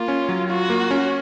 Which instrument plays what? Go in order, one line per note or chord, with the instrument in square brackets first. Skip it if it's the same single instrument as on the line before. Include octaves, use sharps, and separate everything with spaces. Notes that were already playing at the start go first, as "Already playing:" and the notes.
Already playing: [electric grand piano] A#3 [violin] F4
[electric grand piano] C#4
F#3
[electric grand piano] F4 [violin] F#4
[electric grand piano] A#3
C#4